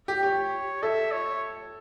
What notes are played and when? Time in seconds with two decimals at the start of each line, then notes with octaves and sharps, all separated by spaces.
0.08 G4
0.22 G4 C#5
0.83 A4 E5
1.12 C#5